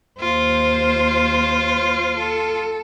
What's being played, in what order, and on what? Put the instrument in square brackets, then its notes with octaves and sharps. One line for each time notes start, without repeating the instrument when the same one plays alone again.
[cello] D#2 C5 [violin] F4
[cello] A4